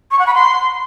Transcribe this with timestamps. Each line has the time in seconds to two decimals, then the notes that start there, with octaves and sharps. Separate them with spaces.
0.11 C#6
0.19 F#5
0.27 B5
0.35 C6